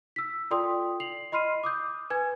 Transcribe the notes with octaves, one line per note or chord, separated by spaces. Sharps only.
E6 B6
F4 A4 D5 G5 C6 D#6
C7 F7 F#7
D#5 B5 C6 F6 C7 D#7
D6 D#6 G6
B4 G#5 G#6